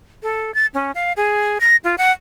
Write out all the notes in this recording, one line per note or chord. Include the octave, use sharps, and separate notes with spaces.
A4
A6
C#4
F5
G#4
A#6
F4
F#5